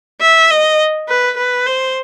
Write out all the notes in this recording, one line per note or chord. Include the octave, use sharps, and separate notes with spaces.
E5
D#5
B4
B4
C5